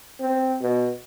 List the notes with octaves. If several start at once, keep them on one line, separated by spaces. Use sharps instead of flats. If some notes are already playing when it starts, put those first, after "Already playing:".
C4
B2